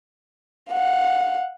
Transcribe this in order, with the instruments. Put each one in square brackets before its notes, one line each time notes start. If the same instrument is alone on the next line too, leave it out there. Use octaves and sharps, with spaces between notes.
[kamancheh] F5 F#5